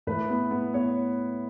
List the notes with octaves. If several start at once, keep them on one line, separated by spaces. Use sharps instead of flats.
A2 B4
B3
B3
B3 C#5